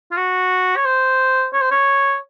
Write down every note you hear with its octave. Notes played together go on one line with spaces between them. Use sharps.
F4
F#4
C#5
C5
C#5
C5
C#5